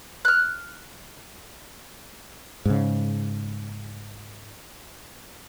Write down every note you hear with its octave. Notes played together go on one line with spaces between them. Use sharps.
F6 F#6
G#2 C#3